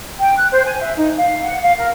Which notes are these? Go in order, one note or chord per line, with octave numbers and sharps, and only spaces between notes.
G5
F#6
C5
G#5
E5
D#4
F5
F#5
F5
A#4